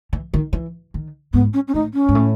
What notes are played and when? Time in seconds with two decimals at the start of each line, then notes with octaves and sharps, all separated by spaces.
0.13 E3
0.34 D#3
0.53 E3
0.94 D#3
1.33 G#2 B3
1.54 C#4
1.68 C#4
1.74 A2 D#4
1.94 C#4
2.09 G#2
2.15 A2